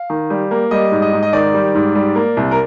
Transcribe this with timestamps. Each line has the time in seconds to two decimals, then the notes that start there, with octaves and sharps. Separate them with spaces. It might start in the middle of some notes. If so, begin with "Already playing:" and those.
Already playing: F5
0.10 D#3
0.30 G3
0.51 A#3
0.71 G3 D#5
0.92 G#2
1.02 D#5
1.13 G#2
1.23 D#5
1.33 D#3 D5
1.54 G3
1.75 G#2
1.95 G3
2.15 A#3
2.37 C2
2.51 A#4